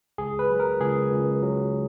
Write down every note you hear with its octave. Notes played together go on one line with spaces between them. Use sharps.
C#2 G#4
B4
F#3
A#4
C#2 G#4
C#2
F#3